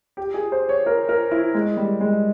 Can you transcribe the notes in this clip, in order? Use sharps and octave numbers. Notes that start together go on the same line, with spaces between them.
G4
G#4
C5
C#5
A#4
A#4
E4
G#3
G3
G#3